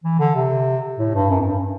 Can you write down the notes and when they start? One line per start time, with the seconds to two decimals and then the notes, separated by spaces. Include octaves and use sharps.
0.04 E3
0.20 D3
0.35 C3
0.99 A2
1.14 G2
1.30 F#2
1.41 F#2
1.46 G2